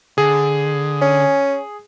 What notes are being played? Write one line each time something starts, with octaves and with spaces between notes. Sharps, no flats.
D3 G#4
C#4